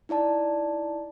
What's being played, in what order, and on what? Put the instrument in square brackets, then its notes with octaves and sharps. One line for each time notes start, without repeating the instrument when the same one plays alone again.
[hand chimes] D#4 E4 D5 A5